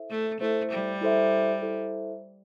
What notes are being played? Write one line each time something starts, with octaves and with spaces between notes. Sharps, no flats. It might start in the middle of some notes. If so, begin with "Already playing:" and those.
Already playing: E4 A4 C5 E5
A3
A3 E4 A4 C5 E5
G3
E4 A4 C5 E5
E4 A4 C5 E5